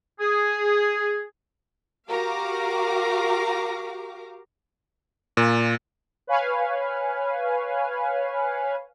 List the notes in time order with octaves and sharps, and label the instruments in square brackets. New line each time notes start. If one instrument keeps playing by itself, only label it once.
[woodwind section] G#4
[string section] F#4 G4 A#4 F5 A#5 D6
[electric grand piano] A#2
[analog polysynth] B4 C#5 F5 G#5